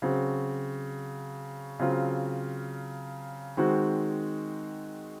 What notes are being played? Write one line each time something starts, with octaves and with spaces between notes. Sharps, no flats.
C#3 F#3 C4 F#4
C#3 F#3 C4 F4
D#3 G#3 C4 F#4